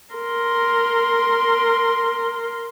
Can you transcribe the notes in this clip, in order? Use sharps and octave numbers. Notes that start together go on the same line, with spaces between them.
A#4 C6